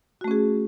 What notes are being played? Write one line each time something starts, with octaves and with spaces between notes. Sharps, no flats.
A3 C#4 F#4 G#4